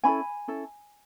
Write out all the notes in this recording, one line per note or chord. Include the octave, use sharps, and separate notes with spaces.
C#4 E4 A4 G#5 B5
C#4 E4 A4